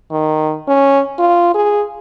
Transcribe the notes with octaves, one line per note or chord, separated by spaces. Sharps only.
D#3
C#4
F4
G#4